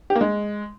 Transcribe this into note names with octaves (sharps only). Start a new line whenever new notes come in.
G4
A#3
G#3